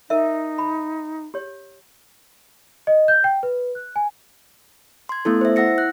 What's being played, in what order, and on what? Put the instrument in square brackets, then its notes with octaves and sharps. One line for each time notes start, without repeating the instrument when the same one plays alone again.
[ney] D#4 [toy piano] A#4 E5
[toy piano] B5
G4 C#5
[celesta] D#5
G6
G5
B4
F#6
G#5
[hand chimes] C6 G#6
A3 B3 E4 A4
C5 E5
E4 F#5 E6 A#6 C#7
F#6